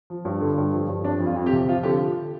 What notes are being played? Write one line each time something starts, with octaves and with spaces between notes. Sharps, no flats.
F3
G2
D3
G2
F3
G2
F3 D4
F2
F4
F2
G4
C3
F3 F4
D3 G4